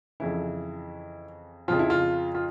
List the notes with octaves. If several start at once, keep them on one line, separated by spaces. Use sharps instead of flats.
F2 C#3 E3 E4
F2 C#3 F3 F4
E4
F4
F4